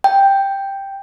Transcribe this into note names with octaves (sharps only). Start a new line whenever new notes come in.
G5